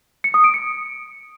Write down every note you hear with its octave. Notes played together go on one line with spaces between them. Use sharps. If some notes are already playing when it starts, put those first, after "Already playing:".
C#7
D#6
D7
C#7